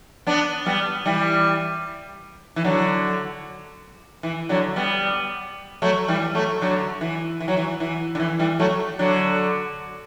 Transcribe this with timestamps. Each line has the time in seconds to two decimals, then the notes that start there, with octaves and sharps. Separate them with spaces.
0.27 B3 D4
0.66 G3 B3
1.06 E3 G3
2.56 E3
2.65 D3 F#3
4.23 E3
4.49 D3 F#3
4.76 G3 B3
5.82 F#3 A3
6.08 E3 G3
6.35 F#3 A3
6.62 D3 F#3
7.01 E3
7.40 E3
7.48 F#3
7.57 E3
7.80 E3
8.15 D3
8.20 E3
8.39 E3 G3
8.60 F#3 A3
8.99 D3 F#3